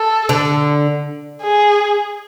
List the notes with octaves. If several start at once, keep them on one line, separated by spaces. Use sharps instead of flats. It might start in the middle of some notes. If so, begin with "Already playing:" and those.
Already playing: A4
D3
G#4